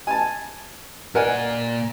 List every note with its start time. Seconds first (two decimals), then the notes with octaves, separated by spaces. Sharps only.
0.07 G#5 A5
1.15 A#2 A#4 D5 F#5 G#5